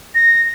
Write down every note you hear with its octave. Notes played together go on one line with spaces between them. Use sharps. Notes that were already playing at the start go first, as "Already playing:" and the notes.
A#6